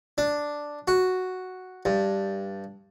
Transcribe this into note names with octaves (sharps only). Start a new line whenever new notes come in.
D4
F#4
G2